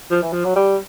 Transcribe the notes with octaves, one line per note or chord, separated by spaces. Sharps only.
F3
E3
F3
F#3
G3